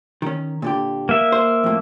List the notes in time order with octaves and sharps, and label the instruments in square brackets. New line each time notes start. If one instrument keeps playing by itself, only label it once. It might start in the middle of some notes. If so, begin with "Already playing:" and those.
[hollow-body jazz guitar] D#3 C#4
A#2 D3 G4
[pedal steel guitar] A#3 E5
[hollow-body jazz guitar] C5
F2 A2